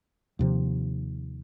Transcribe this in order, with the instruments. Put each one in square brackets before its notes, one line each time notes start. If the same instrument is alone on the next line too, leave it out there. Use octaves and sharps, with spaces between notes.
[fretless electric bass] D#2 C3 F3